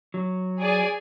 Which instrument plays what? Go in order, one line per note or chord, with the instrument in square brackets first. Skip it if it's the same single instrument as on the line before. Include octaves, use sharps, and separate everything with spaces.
[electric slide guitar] F#3
[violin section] G#4 D5 G#5